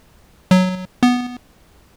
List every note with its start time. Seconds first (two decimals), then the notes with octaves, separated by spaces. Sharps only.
0.51 F#3
1.03 B3